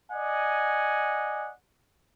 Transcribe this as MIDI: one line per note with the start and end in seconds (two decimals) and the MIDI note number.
0.12 1.52 74
0.12 1.52 75
0.12 1.52 78
0.12 1.52 80